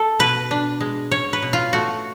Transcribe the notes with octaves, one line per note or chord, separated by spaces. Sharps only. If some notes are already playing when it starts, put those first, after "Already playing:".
Already playing: A4
B2 B4
D4
G#3
C#4 C#5
B4
B2
F4
A3 F#4